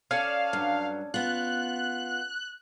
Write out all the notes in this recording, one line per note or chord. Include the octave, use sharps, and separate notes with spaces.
C#4 A4 D5 F5
G2 F#3
B3 F4 F#6